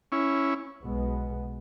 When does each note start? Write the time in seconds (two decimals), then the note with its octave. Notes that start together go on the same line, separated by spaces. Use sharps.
0.12 C#4 E4
0.82 B1 B2 G#3 B3